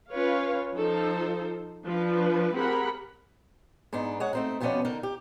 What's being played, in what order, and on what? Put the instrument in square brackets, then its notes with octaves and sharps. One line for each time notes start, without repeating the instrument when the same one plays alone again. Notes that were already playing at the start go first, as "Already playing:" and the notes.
[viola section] C#4 F4 B4 C#5 F5
F3 D#4 F4 A4 C5
F3 D4 B4
C4 G4 G#4 A#4 F#5 B5
[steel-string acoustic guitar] G#2 B3 D4 D#4
G#3 C#5 F#5
A3 C4 D#4
F2 B2 F3 B3 C#4 D5
D3 D#4 A#4
G4